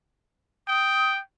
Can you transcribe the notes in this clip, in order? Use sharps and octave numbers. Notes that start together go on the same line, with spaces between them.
G5 D#6